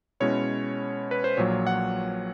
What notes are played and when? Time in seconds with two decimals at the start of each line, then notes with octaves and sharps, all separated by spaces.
0.20 B2 G#3 C#4 E4 C#5
1.11 B4
1.24 C5
1.37 A#1 A#2 F#3 C#5
1.67 F#5